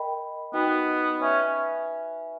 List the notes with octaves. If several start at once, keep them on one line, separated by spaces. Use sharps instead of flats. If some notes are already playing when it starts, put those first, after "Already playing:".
Already playing: A#4 D#5 G5 B5
B3 D#4 F#4 B4 D#5 G5
C#4 B4 E5 G#5 B5